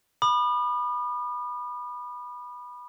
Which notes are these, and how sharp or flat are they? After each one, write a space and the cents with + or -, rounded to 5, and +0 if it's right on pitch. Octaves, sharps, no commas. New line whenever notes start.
B5 -10 D#6 -45